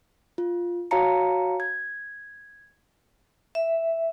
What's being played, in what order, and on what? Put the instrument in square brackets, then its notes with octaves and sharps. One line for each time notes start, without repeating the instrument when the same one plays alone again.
[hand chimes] F4
F#4 C#5 F5 A5 A#5 C#7
G#6
[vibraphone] E5